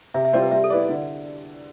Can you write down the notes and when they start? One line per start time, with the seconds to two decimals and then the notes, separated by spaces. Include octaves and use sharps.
0.14 C3 E5
0.25 E5
0.33 G3 C4 F4 C5 D5
0.42 B4
0.51 G3 E5
0.64 A4
0.70 B3 E4 B4 D5
0.89 D3